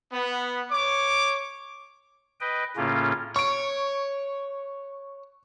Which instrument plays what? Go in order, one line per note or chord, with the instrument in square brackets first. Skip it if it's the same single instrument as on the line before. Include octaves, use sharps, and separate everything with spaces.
[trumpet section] B3
C#5 D6
[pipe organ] B4 D#5 G5
A2 C#3 A#3 C#4 F4
[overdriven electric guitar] C#5 [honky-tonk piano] C#6 D7